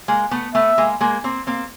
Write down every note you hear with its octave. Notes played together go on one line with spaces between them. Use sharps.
G#3 A#3
A3 B3
A3 B3 E5
G#3 A#3
G#3 A#3
A#3 C4
A#3 C4